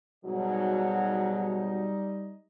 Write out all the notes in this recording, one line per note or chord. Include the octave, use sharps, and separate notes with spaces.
G#2 B2 F#3 G3 D#4 D#5